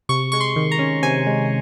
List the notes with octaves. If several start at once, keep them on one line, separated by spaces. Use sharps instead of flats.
C3 C#6
G#3 C#6
C6
D#3
A#5
C#4
C3 G#5
G#3